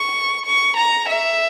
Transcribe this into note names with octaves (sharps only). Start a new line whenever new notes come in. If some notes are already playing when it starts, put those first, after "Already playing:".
Already playing: C#6
C#6
A#5
E5